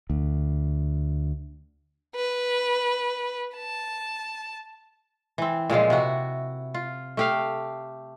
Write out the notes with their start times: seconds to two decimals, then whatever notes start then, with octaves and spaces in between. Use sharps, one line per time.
0.10 D2
2.16 B4
3.56 A5
5.38 E3 C4
5.70 A#2 C#3 F3 G#3
5.90 C3 E4 F#4
6.74 F4
7.17 A3 G4 F5